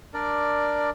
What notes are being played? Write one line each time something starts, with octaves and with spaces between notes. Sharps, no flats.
D4 A#4 D5